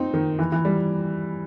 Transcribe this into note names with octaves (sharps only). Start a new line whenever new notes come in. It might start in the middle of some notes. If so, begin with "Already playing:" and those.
Already playing: C4 D#4
D#3
E3
E3
G3